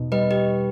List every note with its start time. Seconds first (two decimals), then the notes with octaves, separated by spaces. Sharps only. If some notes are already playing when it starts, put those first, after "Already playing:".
Already playing: E2 B2 D#4
0.12 G3 B4 D#5
0.31 G4 B4